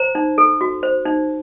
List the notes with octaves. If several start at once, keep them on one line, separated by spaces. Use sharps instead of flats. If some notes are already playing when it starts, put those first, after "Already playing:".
Already playing: C5 A#5
D#4
A4
F#4
C5
D#4